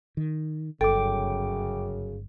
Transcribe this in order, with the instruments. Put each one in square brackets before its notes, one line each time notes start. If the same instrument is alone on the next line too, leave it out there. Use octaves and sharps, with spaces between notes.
[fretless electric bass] D#3
[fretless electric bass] G1 [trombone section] F#2 C#3 [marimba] A4 [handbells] G5 D6